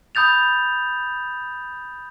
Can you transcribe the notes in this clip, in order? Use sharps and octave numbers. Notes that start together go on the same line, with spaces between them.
B5 D#6 G6 A6 F7